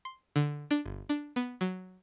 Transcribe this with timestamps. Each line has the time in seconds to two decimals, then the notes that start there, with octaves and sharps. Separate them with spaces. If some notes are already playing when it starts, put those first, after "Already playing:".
0.05 C6
0.36 D3
0.71 D4
0.86 G1
1.09 D4
1.36 B3
1.61 F#3